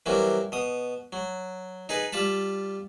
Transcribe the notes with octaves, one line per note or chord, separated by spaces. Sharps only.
E3 F#3 G3 A#3 C4
B2 D#6
F#3
D#4 G#4 B4
G3 F4 A5 B5